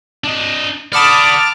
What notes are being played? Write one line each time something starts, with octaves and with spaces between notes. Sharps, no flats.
D4 D#5
D5 F#5 A5 B5 D6 D#6 F6